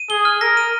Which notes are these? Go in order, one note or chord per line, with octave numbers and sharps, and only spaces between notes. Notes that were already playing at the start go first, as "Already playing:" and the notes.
Already playing: D#7
G#4 G7
F6
A#4 A#6
D#7